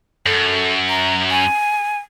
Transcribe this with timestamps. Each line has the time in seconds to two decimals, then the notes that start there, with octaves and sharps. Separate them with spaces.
0.26 F#2 A4
0.89 A#5
1.30 G#5